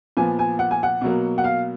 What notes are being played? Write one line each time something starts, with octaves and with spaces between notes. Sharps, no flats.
A#2 F3 B3 G#5
G#5
F#5
G#5
F#5
B2 F#3 A#3
F#5
F5